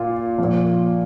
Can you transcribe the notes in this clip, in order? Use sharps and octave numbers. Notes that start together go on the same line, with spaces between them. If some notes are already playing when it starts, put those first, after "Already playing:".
Already playing: A#2 F4
F3
A#2